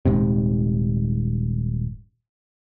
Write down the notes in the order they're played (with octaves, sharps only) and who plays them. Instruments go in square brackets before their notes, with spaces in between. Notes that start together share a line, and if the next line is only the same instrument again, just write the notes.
[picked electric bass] D#1 G#2 C3